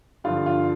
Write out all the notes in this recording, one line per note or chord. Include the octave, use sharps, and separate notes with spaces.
G2 D3 F3 F4
F4